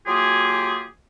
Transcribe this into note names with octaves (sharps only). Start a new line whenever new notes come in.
F#3 A#3 F4 G4 G#4